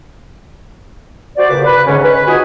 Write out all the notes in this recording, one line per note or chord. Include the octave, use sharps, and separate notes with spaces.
F#4 C5 D5
G2 A#2 C#3 B4 D6
B4
G#2 D3 C#4
B4
B3 D#4 F4 F#4 G#4 G#5